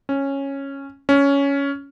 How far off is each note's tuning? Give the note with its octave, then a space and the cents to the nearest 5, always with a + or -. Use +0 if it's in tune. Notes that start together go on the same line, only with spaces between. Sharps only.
C#4 -10
C#4 +10